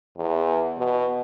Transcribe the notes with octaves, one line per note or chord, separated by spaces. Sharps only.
E2
B2